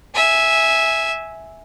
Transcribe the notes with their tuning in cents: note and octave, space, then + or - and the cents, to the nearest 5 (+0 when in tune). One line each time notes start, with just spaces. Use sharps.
E5 -10 G#5 +0